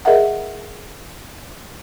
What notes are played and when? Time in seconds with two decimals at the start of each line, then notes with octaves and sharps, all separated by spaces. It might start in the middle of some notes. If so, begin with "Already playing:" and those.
0.05 G#4 A#4 D#5 E5 F#5